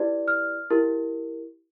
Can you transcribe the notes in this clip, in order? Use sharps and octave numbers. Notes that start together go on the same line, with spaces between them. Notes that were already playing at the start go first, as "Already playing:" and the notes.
Already playing: E4 G4 B4 D5
F6
E4 G4 A#4